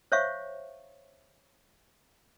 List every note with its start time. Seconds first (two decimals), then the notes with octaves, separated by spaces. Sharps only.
0.12 C5 C#5 E5 F5 C#6